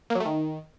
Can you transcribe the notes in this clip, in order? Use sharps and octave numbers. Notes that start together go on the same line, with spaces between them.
A#3
F#3
A3
D#3